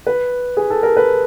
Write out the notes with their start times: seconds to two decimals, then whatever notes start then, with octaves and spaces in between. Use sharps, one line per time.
0.07 B4
0.57 G#4
0.70 A4
0.83 A#4
0.97 B4